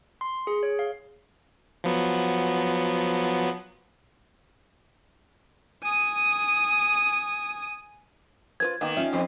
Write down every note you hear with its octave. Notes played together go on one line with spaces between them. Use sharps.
C6
G#4
C#5
F5
F3 F#3 B3
G#5 D#6
F4 B4 C5 G#6
D#3 A#3 B3 G4
C#4 F4 E5 G5
F2 E3 C4